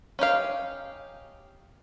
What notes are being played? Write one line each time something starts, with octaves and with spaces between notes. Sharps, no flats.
C#4 D#4 G4 F5